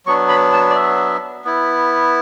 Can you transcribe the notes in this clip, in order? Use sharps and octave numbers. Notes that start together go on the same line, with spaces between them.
F#3 B3 D4 C#6
B5
A5
D5
E5
B3 E4